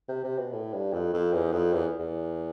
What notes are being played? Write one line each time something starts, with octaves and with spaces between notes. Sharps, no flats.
C3
C3
B2
A2
G2
F2
F2
E2
F2
E2
E2